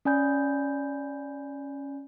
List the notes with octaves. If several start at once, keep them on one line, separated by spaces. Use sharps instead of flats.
C#4 D5 G#5 B5 G6